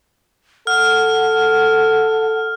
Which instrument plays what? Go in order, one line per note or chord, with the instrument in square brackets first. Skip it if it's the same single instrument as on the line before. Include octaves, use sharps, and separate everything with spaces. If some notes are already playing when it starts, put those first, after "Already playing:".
[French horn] A4 [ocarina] F#5 [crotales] F6